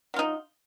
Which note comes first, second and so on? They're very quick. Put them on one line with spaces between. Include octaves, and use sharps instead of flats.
F#3 F4 D#4